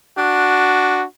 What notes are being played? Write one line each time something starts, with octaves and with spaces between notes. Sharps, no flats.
D4 F#4